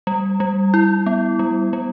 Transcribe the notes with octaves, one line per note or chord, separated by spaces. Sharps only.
G3
G3
E4
B3
G3
G3